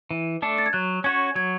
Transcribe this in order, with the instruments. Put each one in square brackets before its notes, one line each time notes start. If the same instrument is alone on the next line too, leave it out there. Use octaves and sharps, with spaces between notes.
[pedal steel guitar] E3
A3 D4 A4
[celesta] A6
G#6
[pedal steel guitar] F#3 [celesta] F#6
[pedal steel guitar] C#4 F#4 C#5 [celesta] G#6
[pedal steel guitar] F#3 [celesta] G#6